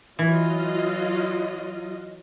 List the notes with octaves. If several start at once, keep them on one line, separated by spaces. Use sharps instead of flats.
E3 F#3 F4 D#5